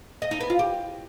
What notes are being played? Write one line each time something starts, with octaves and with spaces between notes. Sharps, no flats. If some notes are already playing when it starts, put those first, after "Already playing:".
D#5
D#4
B3
F4
G4